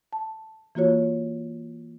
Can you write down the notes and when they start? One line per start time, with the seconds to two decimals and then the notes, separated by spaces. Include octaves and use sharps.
0.13 A5
0.75 E3 A#3 F4 F#4 C#5